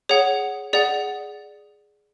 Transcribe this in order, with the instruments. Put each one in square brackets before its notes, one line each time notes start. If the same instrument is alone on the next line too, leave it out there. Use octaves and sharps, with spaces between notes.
[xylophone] G#4 C#5 F#5
G#4 D5 F#5